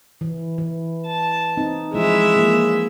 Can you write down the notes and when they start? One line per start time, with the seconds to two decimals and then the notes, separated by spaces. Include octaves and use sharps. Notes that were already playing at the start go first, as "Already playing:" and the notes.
0.21 E3
0.58 E3
1.06 A5
1.57 C4 D#4
1.94 E3 F3 G#3 E4 E5
2.37 F3 A#3